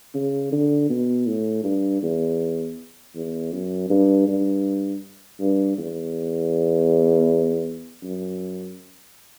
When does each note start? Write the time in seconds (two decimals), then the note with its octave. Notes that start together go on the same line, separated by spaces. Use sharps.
0.14 C#3
0.52 D3
0.89 B2
1.26 A2
1.64 G2
2.02 E2
3.15 E2
3.52 F#2
3.90 G2
4.28 G2
5.40 G2
5.78 E2
8.03 F#2